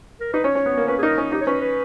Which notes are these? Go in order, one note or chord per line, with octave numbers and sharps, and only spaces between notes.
A#4
D#4 B4
C#4 C#5
C#4
B3
A#3
C#4 B4
G#4
D#4 A#4
C#4
D#4 G4
C#5
C#4 B4
B4